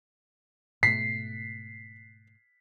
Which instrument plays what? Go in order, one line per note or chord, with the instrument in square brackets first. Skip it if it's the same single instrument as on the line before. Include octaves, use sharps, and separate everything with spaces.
[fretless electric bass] G#2 B2 A3 [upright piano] B6 [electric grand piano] C7